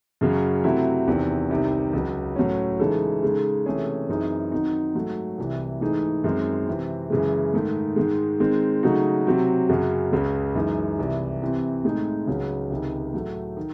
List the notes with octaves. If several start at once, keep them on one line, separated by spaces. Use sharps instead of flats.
F#2 C#3 F#3
C3 F#3 A3 C4 E4
E2 C3 D#3
C2 C3 D#3
C#2 C#3 F#3
A2 F#3 A3 C#4
C#3 E3 G#3 D#4 A4
C#3 G#3 D#4 A4
C3 E3 A3 C#4 G#4
F#2 E3 C4 D#4 G#4
D#3 F#3 C4 D#4
G#2 F#3 A3
C2 C3 E3
G#2 E3 A3 D#4 G#4
F#2 D#3 G#3 C4
C3 E3 C4
F#2 C#3 E3 G#3
G#2 D#3 A3
G#2 D#3 G#3
D#3 G#3 C4
C#3 F#3 A3 D#4 F#4
C3 F#3 C4 F#4
F#2 C#3 F#3
C#2 C#3 G#3
F#2 E3 G#3 D#4
C2 C3 E3
C3 E3 C4
A2 G#3 C4 D#4 G#4
C#2 C#3 F#3 C#4
C#2 C3 D#3
A2 F#3 A3
D#3